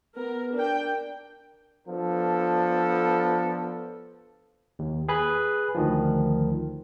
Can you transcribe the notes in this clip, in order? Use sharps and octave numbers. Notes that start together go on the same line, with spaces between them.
B3 A#4
D4 A#4 G5
F3 B3 D4 A4
D#2
G#4 B4 F#6
D2 D#3 F3